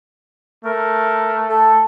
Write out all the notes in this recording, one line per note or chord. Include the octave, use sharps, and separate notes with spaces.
A3 A#4
A4